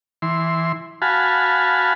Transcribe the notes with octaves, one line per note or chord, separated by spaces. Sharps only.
E3 C6
F#4 F5 G#5 A5 B5